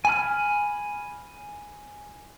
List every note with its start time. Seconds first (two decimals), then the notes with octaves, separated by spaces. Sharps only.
0.05 G#5 B5 F6